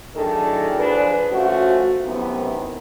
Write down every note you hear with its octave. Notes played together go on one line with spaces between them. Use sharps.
A2 D#3 F#3 D4 G#4 A4
F3 D4 G#4 B4
F3 A3 C#4 F#4
F#2 A2 C3 D#3 B3 E4